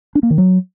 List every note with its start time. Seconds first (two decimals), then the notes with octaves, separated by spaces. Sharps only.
0.15 D4
0.23 A#3
0.30 D#3
0.38 F#3